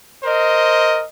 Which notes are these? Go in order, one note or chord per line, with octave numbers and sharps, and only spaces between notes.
A#4 C5 D#5